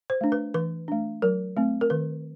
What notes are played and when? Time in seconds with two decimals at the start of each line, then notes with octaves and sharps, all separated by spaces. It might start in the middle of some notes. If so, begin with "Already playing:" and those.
0.10 C5
0.21 A3 D4
0.32 B4
0.54 E3 B4
0.88 A3 D4
1.22 F#3 A#4
1.57 A3 C4
1.81 A#4
1.90 D#3 B4